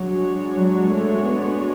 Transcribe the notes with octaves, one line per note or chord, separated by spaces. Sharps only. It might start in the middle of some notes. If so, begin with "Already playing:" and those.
Already playing: F#3 G#3 D4 F#4 C#5
F#3
A3
B3